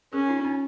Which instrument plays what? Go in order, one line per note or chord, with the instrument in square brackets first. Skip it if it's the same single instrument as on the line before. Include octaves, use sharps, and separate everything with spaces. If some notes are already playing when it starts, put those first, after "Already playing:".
[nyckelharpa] C#4 [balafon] G#4 A#4
[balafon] D#4 F4
C#4 D#4